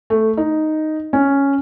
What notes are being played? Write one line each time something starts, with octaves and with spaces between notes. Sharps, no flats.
A3
D#4
C#4